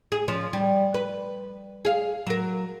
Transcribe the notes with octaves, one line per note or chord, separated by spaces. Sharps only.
G#4
F3 C#4
G3
B4
G#4 F5
F#3 A#4